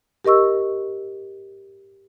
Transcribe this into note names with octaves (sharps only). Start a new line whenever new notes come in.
G4 A#4 D#5 C#6 E6